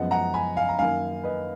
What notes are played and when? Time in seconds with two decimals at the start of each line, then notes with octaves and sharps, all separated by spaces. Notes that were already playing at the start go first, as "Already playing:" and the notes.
Already playing: F#2 F3 G#3 B3 D#5 F#5
0.11 F#5 A#5
0.34 G#5 B5
0.56 F5 G#5
0.69 A#5
0.78 F#2 D#3 A#3 F5 G#5
1.24 B4 D#5